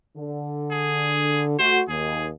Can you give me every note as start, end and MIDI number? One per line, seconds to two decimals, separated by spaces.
0.17 1.57 50
0.71 1.45 68
1.59 1.82 57
1.59 1.82 66
1.59 1.80 72
1.89 2.30 39
1.89 2.27 68